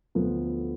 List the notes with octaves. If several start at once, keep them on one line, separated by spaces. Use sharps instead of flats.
D2 D3 F3 B3 F4